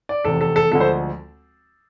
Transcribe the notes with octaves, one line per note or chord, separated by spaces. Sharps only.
D5
F1 E2 C3 A4
A4
A4
D2 D3 F3 G#3 A4
C5